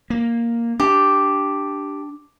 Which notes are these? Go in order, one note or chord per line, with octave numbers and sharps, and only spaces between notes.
A#3
D4 G4